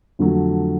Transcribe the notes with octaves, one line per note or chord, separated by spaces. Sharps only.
F2 D3 F#3 A3